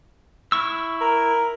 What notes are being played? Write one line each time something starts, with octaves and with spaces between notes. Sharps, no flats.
E4 C#6 E6
A#4